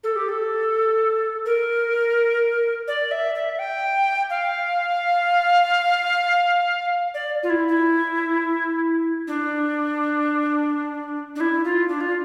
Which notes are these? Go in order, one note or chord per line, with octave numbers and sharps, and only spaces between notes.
A4
G4
A4
A#4
D5
E5
E5
G5
F5
D5
F4
E4
E4
D4
D4
E4
F4
D4
F4